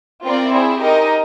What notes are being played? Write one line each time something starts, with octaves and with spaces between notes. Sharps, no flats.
C4 F4 A#4 D5
E4 G#4 C5
D#4 G4 A#4 D#5